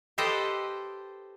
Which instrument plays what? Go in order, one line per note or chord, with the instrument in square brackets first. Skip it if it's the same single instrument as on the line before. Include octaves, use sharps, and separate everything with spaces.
[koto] G4 A4 B4 C5 D#5 G5